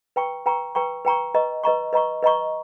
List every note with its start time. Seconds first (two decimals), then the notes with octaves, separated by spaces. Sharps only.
0.16 B4 G5 A#5 C#6
0.46 B4 G5 A#5 C#6
0.75 B4 G5 A#5 C#6
1.05 B4 G5 A#5 C#6
1.34 B4 D#5 A#5 C#6
1.63 B4 D#5 A#5 C#6
1.93 B4 D#5 A#5 C#6
2.22 B4 D#5 A#5 C#6